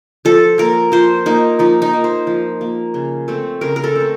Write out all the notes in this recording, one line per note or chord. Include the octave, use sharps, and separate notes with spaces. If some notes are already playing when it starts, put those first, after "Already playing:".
F3 A4
A#3 A#4
F3 C5
A#3 D#4
F3 D#4
D#4
A#3
C5
F3
A#3
C#3
A3 C4
C#3 A#4
A#4
A4
A3 C4